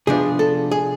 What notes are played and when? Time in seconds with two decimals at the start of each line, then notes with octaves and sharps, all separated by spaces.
0.07 C3 F3 B3 D4 G#4
0.39 A4
0.71 G#4